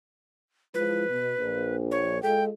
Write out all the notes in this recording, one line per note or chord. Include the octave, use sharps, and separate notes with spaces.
F3 G#3 E4 B4
B2
A#1
C#5
G#3 F4 A4 G5